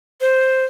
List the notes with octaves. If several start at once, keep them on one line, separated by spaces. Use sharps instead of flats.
C5